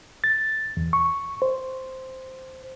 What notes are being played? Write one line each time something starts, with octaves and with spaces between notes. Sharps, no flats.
A6
E2
C#6
C5